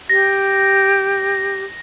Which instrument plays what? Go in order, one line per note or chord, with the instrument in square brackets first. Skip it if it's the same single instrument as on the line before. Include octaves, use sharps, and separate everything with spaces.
[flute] G4 [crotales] A#6